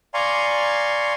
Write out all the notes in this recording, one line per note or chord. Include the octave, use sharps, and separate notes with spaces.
D5 F5 G#5 A#5 C6 C#6